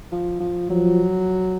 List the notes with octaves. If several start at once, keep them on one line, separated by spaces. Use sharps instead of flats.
F3
F3
F3 F#3